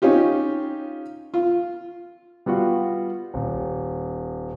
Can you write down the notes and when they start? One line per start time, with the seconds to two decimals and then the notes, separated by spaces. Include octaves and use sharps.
0.02 C#4 D#4 F4 G4
1.34 F4
2.46 G3 B3 F4 F#4
3.34 D#1